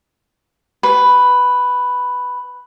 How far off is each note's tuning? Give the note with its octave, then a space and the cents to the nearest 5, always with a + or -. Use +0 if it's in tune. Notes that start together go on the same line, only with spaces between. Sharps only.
B4 +5